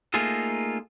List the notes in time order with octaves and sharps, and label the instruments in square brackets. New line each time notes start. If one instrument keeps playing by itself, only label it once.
[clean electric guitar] A3 A#3 D#4 F4 G#4 A4